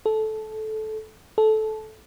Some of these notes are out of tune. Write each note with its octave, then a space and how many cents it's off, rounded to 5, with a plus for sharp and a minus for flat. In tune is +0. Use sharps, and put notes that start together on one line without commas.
A4 -15
A4 -15